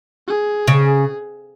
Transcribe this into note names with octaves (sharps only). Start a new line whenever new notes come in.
G#4
C#3